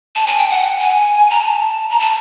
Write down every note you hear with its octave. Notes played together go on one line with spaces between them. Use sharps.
A5
G#5
G5
F#5
G#5
A#5
A5
A#5
A5